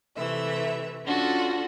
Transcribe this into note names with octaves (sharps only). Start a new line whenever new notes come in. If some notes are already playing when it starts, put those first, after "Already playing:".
C3 E3 A3 E5
C#4 D4 F4 F#4 A4